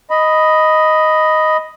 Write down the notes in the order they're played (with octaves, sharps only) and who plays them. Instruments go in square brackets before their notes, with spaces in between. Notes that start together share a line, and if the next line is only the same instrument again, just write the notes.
[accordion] D#5 B5